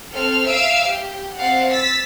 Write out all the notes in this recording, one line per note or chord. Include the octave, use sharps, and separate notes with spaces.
C4 A4 F6
E5 F5 E6 D7
G4
C4 D5 F5 F#5
E6 A6 B6